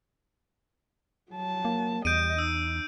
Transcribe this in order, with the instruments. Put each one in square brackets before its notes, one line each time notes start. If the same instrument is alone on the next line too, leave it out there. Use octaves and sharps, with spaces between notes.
[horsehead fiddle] F#3 A5
[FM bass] A#3
[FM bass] E2 [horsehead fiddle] G3 D#5 [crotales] G6 D7 D#7
[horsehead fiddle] D#4 [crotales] E6